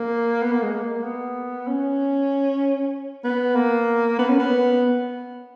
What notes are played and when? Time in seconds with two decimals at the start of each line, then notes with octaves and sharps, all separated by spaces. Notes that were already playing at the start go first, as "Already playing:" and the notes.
Already playing: A#3
0.42 B3
0.52 A#3
0.62 G#3
0.72 A#3
1.04 B3
1.67 C#4
3.24 B3
3.55 A#3
4.19 B3
4.29 C#4
4.39 B3